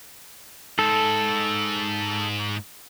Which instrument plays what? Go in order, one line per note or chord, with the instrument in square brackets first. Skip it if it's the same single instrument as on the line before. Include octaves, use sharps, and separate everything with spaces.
[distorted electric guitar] G#2 G#3 [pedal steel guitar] A4